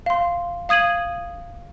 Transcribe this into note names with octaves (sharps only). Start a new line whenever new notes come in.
F5 C6
F5 D#6 G#6 D#7 F#7